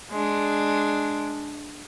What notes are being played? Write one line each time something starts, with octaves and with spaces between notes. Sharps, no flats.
G#3 D4